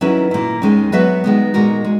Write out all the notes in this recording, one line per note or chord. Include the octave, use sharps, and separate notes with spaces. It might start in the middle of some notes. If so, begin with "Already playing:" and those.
D#3 F#3 C#4 E4 B4
A#2 A#3 E4
D#2 D#3 G#3 C#4
F#3 B3 F#4 B4 E5
D#3 G#3 B3
A#2 G#3 D#4 F#4 A#4
G#3